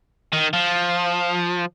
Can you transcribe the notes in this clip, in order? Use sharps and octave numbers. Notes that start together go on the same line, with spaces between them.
D#3
F3